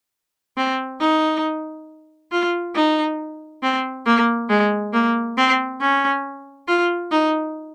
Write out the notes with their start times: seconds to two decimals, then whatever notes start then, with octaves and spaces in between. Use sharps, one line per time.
0.57 C4
1.00 D#4
2.32 F4
2.75 D#4
3.63 C4
4.06 A#3
4.49 G#3
4.93 A#3
5.37 C4
5.81 C#4
6.68 F4
7.11 D#4